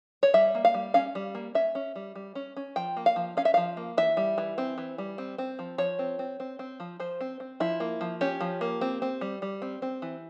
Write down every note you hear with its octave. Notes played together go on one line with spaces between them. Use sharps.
C#5
G3 E5
A#3
F5
G3
C#4 F5
G3
A#3
C#4 E5
C#4
G3
G3
C#4
C#4
F3 G5
A#3
F5
F3
C#4 F5
E5
F3 F5
A#3
E3 E5
G3
E3
C4
E3
G3
C4
C4
F3
F3 C#5
C4
C4
C4
C4
F3
F3 C5
C4
C4
F3 E4
A#3
F3
C#4 G4
F3
A#3
C4
C4
G3
G3
C4
C4
E3